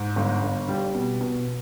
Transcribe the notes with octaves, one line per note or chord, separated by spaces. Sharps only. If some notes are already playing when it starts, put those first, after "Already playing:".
Already playing: G#2
G1
G1
G3
B2
B2